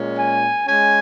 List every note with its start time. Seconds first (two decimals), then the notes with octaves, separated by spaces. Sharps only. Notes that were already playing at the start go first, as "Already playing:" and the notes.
Already playing: A#2 G#3 C#4
0.17 G#5
0.67 G#3 C#4 G#5